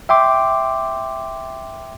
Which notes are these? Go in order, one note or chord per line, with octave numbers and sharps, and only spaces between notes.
E5 G5 C6 D6